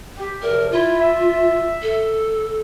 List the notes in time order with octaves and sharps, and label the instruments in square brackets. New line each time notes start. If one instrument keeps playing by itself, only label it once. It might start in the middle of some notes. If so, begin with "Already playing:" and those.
[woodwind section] G4
[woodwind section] E2 C3 F3 [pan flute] A#4
[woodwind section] E4 [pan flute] F4
[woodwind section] E5
[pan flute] A4